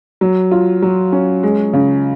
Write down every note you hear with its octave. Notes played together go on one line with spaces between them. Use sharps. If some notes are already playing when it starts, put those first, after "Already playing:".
F#3
F4
F#3
C#4
G#3
C#3